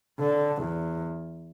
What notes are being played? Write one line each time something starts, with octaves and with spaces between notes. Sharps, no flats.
D3
E2